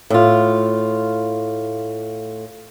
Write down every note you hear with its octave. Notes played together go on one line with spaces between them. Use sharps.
A2 F4